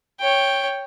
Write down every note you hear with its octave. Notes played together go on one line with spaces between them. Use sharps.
C#5 G5